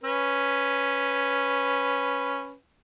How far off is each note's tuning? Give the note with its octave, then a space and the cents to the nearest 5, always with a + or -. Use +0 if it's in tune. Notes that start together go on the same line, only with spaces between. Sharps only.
C#4 +0 B4 +0